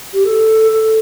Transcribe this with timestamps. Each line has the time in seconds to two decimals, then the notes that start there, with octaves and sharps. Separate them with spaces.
0.13 G4
0.24 A4
0.72 A4